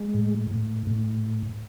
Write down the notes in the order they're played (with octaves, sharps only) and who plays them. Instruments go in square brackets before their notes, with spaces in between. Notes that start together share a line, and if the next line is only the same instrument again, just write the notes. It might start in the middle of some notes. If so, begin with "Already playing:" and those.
Already playing: [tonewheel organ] G#3
A2
A2
A2